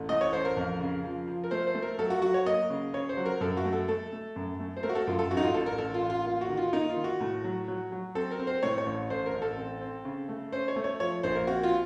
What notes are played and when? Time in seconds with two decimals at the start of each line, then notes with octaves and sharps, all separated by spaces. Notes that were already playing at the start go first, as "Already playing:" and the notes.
Already playing: A1
0.09 A2 D#5
0.21 C#5
0.32 A1 C5
0.45 A#4
0.57 F2
0.80 C#3
1.04 F3
1.27 F3
1.44 A#4
1.51 A3 C5
1.67 C5
1.75 A3
1.82 A#4
1.99 F#3 A4
2.10 F#4
2.22 F#3 F#4
2.34 C#5
2.46 A#3 D#5
2.70 C#3
2.93 C#3 C#5
3.09 C5
3.17 F#3
3.25 A#4
3.41 F#2 A4
3.57 F#4
3.65 A3
3.73 A4
3.88 A3 A4
4.12 A3
4.36 F#2
4.60 A3
4.77 C5
4.83 A3 A#4
4.89 F#4
4.95 A4
5.07 F#2 F4
5.19 A4
5.31 A1 F#4
5.37 D#4
5.42 F4
5.54 A1 A4
5.66 A#4
5.78 A1 A4
5.94 F4
6.02 A1
6.10 F4
6.25 A#3 F4
6.41 F#4
6.49 D#3
6.57 F4
6.73 A#3 D#4
6.89 F4
6.97 D#3
7.04 F#4
7.20 A2
7.44 F#3
7.68 F#3
7.92 F#3
8.15 C4 A4
8.31 A#4
8.39 C4
8.47 C5
8.63 A2 C#5
8.78 C#5
8.86 A1
9.10 A1 C5
9.26 A#4
9.34 A1
9.42 A4
9.57 C4
9.81 C4
10.05 C#3
10.28 A3
10.52 C#4 C5
10.68 C#5
10.76 A3
10.84 C#5
11.00 F3 C#5
11.23 A#1 C5
11.35 A#4
11.47 C4 F#4
11.63 F4